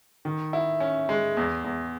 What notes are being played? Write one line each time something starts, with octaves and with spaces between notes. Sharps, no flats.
D#3
E4
C#4
G#3
E2
E2